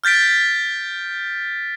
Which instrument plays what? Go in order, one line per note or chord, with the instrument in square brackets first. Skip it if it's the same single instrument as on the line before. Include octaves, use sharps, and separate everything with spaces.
[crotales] F6 G6 A6 B6 D7